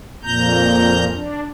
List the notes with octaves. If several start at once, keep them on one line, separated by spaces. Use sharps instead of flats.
F2 A#2 A#5 G6
D4